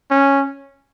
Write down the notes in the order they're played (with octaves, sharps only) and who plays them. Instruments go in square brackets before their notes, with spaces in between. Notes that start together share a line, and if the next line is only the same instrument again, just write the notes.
[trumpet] C#4